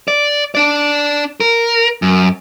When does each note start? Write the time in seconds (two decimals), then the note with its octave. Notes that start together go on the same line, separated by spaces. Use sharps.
0.08 D5
0.55 D4 D5
1.40 A#4
2.02 F#2